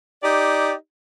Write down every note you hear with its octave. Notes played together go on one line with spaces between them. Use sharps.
D#4 G4 D5